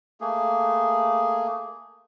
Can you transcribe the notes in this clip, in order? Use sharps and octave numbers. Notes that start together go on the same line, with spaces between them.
A3 A#3 G#4